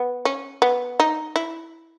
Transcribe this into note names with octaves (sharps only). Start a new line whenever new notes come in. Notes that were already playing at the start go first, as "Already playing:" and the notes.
Already playing: B3
C#4
B3
D#4
E4